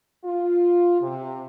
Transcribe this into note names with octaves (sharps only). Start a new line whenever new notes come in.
F4
C3